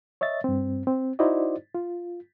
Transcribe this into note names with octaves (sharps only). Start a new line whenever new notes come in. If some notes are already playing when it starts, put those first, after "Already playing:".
C#5 D#5 E5 A6
G2 C4
C4
D#4 E4 F#4 C5 D5 D#5
F4